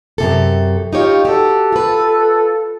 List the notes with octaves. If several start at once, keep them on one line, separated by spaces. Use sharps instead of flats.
F#2 C3 A4
D#4 F4 G4 C#5
F#4 G4 A4
F4 B4